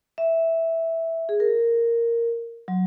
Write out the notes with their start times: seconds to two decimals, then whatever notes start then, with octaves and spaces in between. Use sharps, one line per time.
0.18 E5
1.29 G#4
1.40 A#4
2.68 F#3